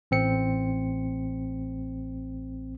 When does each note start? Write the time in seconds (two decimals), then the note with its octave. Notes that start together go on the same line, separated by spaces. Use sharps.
0.11 A1 C4 C#7